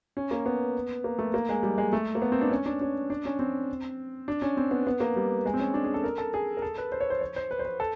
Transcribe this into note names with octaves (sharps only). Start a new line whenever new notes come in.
C#4
A#3
B3
A#3
A3
A#3
G#3
G3
G#3
A3
A#3
B3
C4
D4
C#4
D4
C#4
D4
C#4
C4
D4
C#4
C4
B3
B3
A#3
G3
G#3
C4
C#4
D4
G#4
A4
A#4
A4
G#4
A#4
A4
B4
C5
C#5
C5
C#5
C5
B4
C5
B4
A4